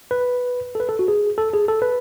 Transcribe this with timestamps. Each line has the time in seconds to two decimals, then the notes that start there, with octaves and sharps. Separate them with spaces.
0.11 B4
0.75 A4
0.80 B4
0.89 A4
0.99 F#4
1.08 G#4
1.38 A4
1.54 G#4
1.68 A4
1.82 B4